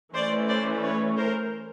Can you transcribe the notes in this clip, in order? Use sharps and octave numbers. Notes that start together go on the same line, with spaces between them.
E3 A3 C#4 C5 D5
C5 D5
B4 C#5
A#4 C5